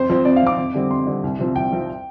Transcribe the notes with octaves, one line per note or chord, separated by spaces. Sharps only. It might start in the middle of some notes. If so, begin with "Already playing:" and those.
Already playing: F2 C5
F3 C4
F2 D5
F5
F3 C4 D6
F2
D3 G3 C4
F2 C6
D3 G3 C4
C2
C3 F3 C4
C2 G5
C3 F3 C4